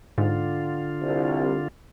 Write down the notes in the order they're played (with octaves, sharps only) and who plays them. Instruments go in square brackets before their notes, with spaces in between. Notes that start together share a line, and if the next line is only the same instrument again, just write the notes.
[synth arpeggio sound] G#2 [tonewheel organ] D3 F4
[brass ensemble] C2